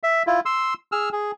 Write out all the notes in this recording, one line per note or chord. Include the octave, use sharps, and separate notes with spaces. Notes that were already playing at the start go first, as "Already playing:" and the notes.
E5
E4 F4
C6 E6
G#4 E6 F6
G#4